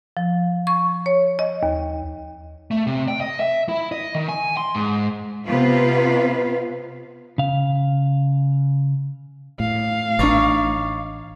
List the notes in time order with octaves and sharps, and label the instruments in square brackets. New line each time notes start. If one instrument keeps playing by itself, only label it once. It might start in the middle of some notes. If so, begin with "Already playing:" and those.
[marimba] F3
C#6
C#5
D#5
D#2
[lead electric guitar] A3
C3
G5
D#5
E5
E4
D#5
D#3
G#5
C6
G#2
[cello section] C3 B3 F4 B4 F5
[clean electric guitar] C#3 F5
[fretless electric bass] A2 [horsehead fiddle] F5
[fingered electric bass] A1 D4 [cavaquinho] D#4 C#5 D5